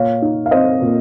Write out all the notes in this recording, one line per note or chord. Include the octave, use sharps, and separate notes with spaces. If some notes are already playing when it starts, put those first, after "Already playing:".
Already playing: A#2 C#5 F5
D#4
F5
C4 C5 D#5
A#2